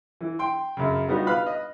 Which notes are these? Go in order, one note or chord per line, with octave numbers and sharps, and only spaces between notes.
E3
G5 C6
F#2 C#3
G3 B3 D#4 F4 F#4
B4 F5 B5 F6 F#6
D#5